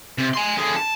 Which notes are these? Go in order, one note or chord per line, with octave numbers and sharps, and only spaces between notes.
C3
G#5 C6
D3 G#4
A5